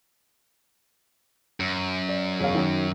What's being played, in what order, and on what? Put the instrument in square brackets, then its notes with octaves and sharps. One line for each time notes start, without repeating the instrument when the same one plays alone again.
[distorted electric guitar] F#2
[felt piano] D5
E1 C#5 F5
D#3 F#3